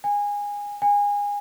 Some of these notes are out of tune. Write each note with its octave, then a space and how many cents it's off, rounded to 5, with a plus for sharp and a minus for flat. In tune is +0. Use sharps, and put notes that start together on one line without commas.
G#5 -20
G#5 -25